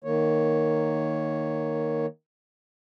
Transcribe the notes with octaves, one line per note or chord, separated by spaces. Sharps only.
D#3 A#3 C#5